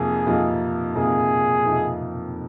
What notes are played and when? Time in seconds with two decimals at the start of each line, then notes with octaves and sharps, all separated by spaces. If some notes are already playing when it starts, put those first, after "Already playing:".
Already playing: F2 C3 F3 A#3 D#4 G#4
0.26 F2 C3 F3 A#3 D#4
0.95 F2 C3 F3 A#3 D#4 G#4
1.66 F2 C3 F3 A#3 D#4